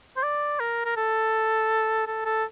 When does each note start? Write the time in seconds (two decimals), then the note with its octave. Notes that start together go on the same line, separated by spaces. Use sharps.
0.16 C5
0.23 D5
0.60 A#4
0.85 A#4
0.97 A4
2.07 A4
2.25 A4